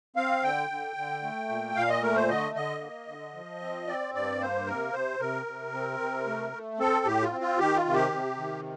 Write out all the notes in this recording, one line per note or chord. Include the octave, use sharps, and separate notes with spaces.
C4 F5
D3 G5
D3
D3
A3
A#2
A#2 F5
D#5
A3 A#4
C5
D3 D#5
D3 D#5
A#3
D3
F3
C4
C4 D5
G2 D5
A#3 C5
C3 A#4
C3 C5
C3 A#4
C3
C4
C3
A3
A3
C4 A4
A2 G4
F4
C4
F4
D#3 G4
F4
C3
G4
C3
D#3